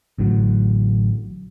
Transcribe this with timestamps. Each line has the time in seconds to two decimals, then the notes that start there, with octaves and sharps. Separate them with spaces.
0.18 A1 A2 D3 F#3